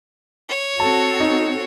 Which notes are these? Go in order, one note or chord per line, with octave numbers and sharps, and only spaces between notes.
C#5
C4 F#4 A4 A5
D#4